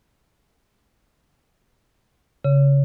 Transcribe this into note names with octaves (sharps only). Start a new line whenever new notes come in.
C#3